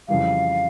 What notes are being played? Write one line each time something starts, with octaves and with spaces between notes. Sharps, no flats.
F2 C#3 E3 G3 F5